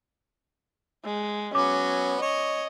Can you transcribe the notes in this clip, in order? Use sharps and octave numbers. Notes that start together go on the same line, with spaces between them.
G#3
F#3 B3 C#4 D6
C#5 D#5